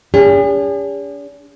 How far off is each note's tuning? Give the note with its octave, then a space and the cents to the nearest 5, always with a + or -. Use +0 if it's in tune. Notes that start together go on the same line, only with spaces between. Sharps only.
D4 -45 G#4 -45